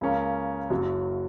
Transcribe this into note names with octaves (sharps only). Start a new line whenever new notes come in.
C#2 C#3 A#3 C#4 A#4
F#1 F#2 F#3